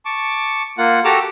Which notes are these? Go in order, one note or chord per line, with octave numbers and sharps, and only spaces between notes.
A5 C#6 D6
A#3 F4 F#5
F#4 G4 A4 A#5 D6 E6